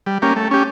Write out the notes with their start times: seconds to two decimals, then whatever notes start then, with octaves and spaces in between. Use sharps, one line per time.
0.06 G3
0.22 A#3 C#4 G4
0.36 A3
0.51 C#4 G4